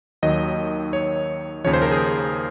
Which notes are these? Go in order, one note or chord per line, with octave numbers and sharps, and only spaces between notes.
D#2 D#3 F#3 D#5
C#5
D#2 C#3 F3 C#5
C5
A#4
G#4